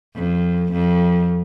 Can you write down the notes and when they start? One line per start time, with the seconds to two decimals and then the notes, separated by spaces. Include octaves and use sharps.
0.15 F2
0.72 F2